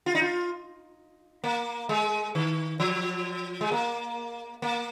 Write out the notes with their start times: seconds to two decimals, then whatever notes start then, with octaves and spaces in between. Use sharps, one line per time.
0.06 F4
0.15 D#4
0.22 F4
1.44 A#3
1.89 G#3
2.35 D#3
2.80 F3
3.61 G#3
3.72 A#3
4.62 A#3